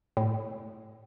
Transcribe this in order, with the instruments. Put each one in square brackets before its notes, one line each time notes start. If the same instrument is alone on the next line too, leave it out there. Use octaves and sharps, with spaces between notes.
[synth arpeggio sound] A2